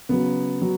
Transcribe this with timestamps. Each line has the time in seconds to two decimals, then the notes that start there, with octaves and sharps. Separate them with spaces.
0.09 C#3 F#3 B3
0.62 F#3